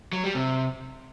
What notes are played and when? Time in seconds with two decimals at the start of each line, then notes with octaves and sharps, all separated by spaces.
0.13 F#3
0.24 G3
0.35 C3